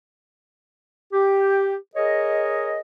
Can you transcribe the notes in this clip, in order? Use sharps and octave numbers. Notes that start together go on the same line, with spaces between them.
G4
G#4 A#4 C#5 D#5